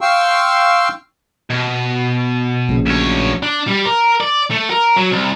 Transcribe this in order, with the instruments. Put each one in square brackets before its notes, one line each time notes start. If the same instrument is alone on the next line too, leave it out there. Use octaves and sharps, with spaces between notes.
[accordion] F5 G5 C6 C#6 E6
[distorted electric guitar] B2
[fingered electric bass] A#1 A#2 C#3
[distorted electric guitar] D2 C#5
[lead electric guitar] D4
G3
A#4
D5
A3
A#4
F#3
C2